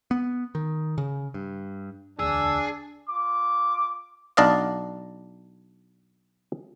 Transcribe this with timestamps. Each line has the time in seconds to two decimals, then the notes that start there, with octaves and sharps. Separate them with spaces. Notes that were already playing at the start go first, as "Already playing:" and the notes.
0.11 B3
0.55 D#3
0.98 C#3
1.34 G2
2.19 E1 D2 D4 G#4 E6
3.09 F4 D6
4.37 B1 D4 D5 D#5 F5